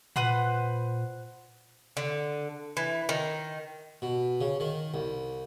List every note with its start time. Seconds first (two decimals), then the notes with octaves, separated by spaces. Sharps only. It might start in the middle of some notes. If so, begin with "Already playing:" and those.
0.16 A#2 B4 C5 F#5
1.97 D3
2.77 E3
3.09 D#3
4.02 B2
4.41 C#3
4.60 D#3
4.94 C2